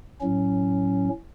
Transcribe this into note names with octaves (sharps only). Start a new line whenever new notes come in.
A2 F#3 C#4